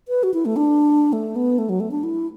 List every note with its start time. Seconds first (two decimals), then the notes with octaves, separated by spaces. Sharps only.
0.08 B4
0.23 F#4
0.34 E4
0.45 A3
0.56 D4
1.13 A3
1.36 B3
1.58 A3
1.69 F#3
1.80 A3
1.91 D4
2.04 E4